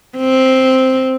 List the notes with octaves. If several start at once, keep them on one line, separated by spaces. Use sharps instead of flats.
C4